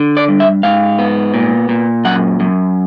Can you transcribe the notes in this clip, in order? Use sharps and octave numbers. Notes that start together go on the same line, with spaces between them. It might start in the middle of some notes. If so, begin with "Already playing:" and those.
Already playing: D3
D5
G2
E5
G#2 F5
B3
A#2
A#2
F#2 F#5
F#2